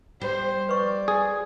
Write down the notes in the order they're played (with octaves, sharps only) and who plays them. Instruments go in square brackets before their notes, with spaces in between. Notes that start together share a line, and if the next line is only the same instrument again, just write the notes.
[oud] G3 [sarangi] C5
[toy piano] B4 C#6 [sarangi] D5
[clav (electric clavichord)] G#4